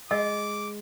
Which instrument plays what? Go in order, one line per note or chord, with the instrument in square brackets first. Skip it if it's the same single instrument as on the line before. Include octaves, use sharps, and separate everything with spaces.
[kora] G#3 [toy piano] D#5 [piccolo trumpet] D6